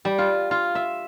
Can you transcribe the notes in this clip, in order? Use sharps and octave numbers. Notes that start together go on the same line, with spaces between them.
G3
F4
F4
E5